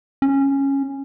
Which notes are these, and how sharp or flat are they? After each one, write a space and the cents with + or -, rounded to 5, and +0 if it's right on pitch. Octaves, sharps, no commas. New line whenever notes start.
C#4 -10